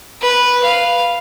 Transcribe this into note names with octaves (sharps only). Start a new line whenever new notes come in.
B4
F5